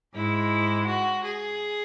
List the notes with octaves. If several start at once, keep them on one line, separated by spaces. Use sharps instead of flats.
G#2 G#3 E4
F#4
G#4